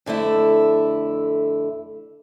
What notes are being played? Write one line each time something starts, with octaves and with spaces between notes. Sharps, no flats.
F2 D3 A3 E4